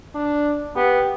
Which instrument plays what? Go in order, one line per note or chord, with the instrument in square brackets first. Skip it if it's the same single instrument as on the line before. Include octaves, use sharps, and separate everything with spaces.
[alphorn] D4
[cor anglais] B3 [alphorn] G4